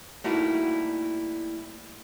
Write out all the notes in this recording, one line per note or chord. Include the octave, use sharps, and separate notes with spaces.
G3 A3 A#3 D#4 E4 F#4